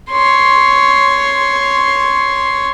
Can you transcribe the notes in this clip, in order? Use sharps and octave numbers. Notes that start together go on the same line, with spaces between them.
C#5 C6